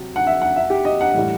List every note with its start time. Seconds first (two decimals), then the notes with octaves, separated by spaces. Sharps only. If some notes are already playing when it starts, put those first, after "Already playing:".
Already playing: C3 F#3
0.16 F#5
0.27 E5
0.42 F#5
0.56 E5
0.70 G4
0.85 D#5
1.01 F#5
1.14 A2 E3 G3